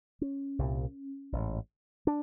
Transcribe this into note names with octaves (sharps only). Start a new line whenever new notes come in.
C#4
C2 A#2
A1 G#2
D4